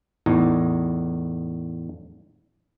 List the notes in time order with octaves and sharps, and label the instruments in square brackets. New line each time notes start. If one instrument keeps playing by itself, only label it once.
[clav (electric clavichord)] E2 A2 D#4